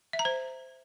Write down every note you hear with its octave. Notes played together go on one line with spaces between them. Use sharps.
E5
A#5
C5